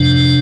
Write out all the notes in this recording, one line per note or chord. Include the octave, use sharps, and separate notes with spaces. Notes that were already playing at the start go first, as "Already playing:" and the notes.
Already playing: F2 A2 C3 D4